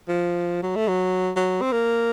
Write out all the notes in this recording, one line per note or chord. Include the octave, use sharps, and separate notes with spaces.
F3
F#3
A3
F#3
F#3
C4
A#3